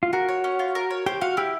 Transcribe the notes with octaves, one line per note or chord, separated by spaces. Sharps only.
F4
F#4 A#4
C#5
C#4
F4
A#4
C#5
G4 C5
F#4 F5
E4 G4